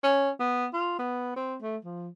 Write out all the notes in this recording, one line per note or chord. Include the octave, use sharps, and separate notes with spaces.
C#4
B3
F4
B3
C4
A3
F3